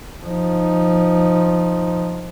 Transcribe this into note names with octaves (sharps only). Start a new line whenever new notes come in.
F3 D#4